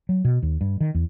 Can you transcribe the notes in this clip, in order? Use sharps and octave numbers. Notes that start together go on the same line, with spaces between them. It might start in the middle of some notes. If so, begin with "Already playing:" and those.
F#3
B2
D#2
G2
D#3
E2